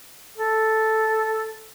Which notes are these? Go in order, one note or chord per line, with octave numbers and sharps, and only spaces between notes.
A4